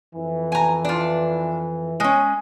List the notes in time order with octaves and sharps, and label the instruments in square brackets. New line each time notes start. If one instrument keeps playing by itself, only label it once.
[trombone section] F2 E3
[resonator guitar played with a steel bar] G#5 A#5
D4 F4
G#3 C#4